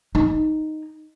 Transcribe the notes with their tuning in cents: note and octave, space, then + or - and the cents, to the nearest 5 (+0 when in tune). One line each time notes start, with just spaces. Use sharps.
D#4 +0